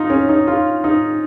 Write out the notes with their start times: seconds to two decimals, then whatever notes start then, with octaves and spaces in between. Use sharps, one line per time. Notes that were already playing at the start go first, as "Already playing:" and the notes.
Already playing: D#4 F4
0.10 C#4
0.29 D#4
0.47 F4
0.84 D#4